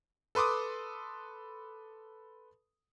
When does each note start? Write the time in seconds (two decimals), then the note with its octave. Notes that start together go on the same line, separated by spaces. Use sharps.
0.35 A4 B4 C6 D6 D#6